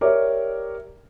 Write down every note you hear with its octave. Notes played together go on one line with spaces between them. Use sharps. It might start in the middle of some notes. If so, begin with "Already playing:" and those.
G4 A#4 C#5 D5 E5 D6